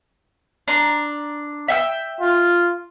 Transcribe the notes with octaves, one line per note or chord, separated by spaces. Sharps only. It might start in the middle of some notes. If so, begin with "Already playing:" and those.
D4 A#5 C6
E5 G5 E6
F4